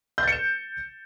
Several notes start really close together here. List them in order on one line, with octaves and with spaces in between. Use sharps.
G6 A6 C#7 E7